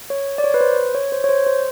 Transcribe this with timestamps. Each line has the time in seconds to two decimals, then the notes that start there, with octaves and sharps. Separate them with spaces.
0.10 C#5
0.38 D5
0.44 C#5
0.54 B4
0.61 C5
0.95 C#5
1.12 C5
1.24 C#5
1.29 C5
1.47 C5